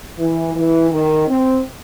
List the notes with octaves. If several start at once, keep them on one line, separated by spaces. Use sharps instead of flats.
E3
E3
D#3
C4